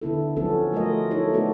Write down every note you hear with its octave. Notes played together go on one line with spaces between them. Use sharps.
D3 B3 E4 A4
F3 F#3 B3 C#4 A4
F#3 A3 F4 A#4 D#5
D#4 E4 A4 C#5
A3 B3 D#4 F#4 A4 D5